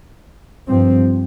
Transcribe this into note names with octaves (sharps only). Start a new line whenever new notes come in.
G2 F3 C4